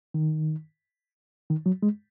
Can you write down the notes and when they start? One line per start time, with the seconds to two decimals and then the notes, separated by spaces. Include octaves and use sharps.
0.14 D#3
1.50 D#3
1.66 F#3
1.83 G#3